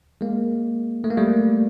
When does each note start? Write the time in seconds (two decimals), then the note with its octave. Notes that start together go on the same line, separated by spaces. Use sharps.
0.21 G#3 A#3
1.04 A3
1.10 A#3
1.17 G3 A3